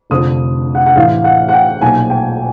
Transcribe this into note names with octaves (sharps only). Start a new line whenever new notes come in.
F1 F2 D3 F3 D#6
F#5
F#5
A1 A2 E3 F5
F#5
F#5
G5
B1 A#2 F3 G#5
G5